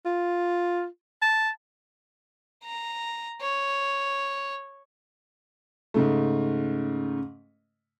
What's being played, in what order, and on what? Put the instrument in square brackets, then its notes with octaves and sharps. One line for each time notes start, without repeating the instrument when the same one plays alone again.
[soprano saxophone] F4
A5
[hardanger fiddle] A#5
C#5
[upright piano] G#2 C#3 A3